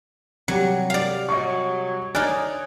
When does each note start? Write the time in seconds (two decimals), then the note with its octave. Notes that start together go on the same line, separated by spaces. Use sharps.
0.48 C3 F#3 G3 G4
0.90 D5 F5
1.29 F#3 D#5 C#6
2.15 D#4 C#5 D5 G#5 F6 F#6